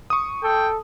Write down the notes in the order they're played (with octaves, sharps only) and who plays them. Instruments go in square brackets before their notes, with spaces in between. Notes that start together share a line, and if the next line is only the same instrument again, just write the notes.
[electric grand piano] C#6 D#6
[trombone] A4 [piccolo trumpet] G5